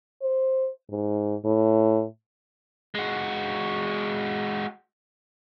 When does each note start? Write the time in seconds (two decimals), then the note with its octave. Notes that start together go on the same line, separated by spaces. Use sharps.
0.22 C5
0.90 G#2
1.45 A2
2.95 G#3 F#4